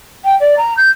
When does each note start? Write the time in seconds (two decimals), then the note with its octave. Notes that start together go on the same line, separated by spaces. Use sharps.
0.24 G5
0.40 D5
0.57 A#5
0.77 G6